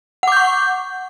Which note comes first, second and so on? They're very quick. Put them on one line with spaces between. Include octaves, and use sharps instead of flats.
F#5 D6 G6 C#6